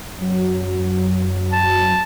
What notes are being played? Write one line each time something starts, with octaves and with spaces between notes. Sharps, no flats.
F#2 F#3
A5